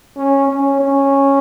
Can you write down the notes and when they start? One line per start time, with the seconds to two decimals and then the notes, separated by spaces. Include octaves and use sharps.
0.17 C#4
0.48 C#4
0.80 C#4